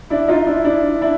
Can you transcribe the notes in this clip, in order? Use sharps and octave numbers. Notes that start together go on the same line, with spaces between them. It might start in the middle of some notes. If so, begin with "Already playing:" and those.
D4 E4
D#4 F4
D4 E4
D4 E4
D4 E4